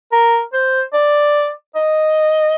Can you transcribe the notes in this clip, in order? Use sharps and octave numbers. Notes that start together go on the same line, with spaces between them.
A#4
C5
D5
D#5